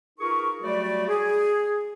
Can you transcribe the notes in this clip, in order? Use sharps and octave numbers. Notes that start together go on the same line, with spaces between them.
D#4 F4 G#4 A#4 B4 C#6
F#3 G3 A3 F#4 G4 D5
G#4